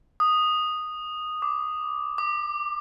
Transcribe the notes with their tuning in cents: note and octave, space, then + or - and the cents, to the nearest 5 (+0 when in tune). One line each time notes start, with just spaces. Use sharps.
D#6 -5
D6 -5
D6 +25